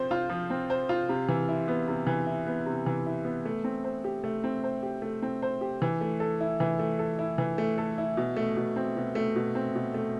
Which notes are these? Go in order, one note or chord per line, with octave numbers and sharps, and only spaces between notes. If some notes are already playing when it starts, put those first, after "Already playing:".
Already playing: F3 C4 C5
F4
F3
C4
C5
F4
C3
E3
E4
B3
C3
E3
E4
B3
C3
E3
E4
B3
A3
C4
C5
G4
A3
C4
C5
G4
A3
C4
C5
G4
E3
A3
A4
E4
E3
A3
A4
E4
E3
A3
A4
E4
B2
A3
B2
C4
B2
A3
B2
C4
B2
A3